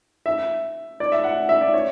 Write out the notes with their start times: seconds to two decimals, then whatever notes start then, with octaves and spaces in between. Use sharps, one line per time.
0.26 E5
1.00 D5
1.12 E5
1.24 F#5
1.49 E5
1.61 D5
1.74 C#5